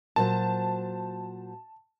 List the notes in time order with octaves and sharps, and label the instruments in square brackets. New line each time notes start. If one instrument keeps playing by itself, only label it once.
[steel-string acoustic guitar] A#2 F#3 C5 [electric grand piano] A5